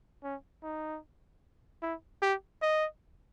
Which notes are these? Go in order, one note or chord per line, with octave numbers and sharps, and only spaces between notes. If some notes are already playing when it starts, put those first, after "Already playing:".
C#4
D#4
E4
G4
D#5